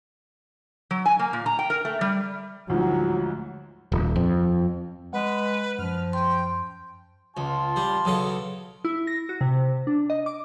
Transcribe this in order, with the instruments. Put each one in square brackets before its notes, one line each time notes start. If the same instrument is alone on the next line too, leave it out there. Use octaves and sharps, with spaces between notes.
[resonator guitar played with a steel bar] F#3
G#5
A#3
A#2
A#5
G5
A#4
A3
G3
[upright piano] D2 G#2 F3 [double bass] F#3
[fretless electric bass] D#1
F2
[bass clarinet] G#3 [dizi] B4 [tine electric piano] F#5
[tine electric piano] F#2 [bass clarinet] F3 [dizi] F6
[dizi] G5 [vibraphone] C6
[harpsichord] C#2 [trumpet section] F4 A5 C6
[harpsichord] G3
B1 C#3 A4
[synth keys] E4
A#6
F#4
C3
D4
D#5
D6